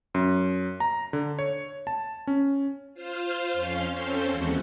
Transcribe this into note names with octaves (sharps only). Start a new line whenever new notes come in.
F#2
A#5
D3
C#5
A5
C#4
F4 C5 F5
F2 C#4 F5 C6
C4 C#4 A4 C5
D#2 E3 G#3 F#4